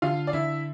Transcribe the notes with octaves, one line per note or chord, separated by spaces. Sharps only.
D3 F4 F5
D5
D3 E4 E5